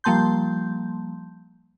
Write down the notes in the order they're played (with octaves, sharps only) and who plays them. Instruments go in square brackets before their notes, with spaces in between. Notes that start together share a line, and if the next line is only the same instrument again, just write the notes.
[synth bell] F3 G3 A#3 A5 C6 G6